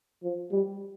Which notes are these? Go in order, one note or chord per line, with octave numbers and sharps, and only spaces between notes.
F3
G3